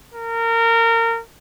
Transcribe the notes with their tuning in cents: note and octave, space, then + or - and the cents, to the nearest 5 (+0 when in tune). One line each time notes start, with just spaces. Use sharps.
A#4 -25